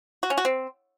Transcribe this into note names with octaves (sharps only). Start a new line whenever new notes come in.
F#4
C#4
F#4
C4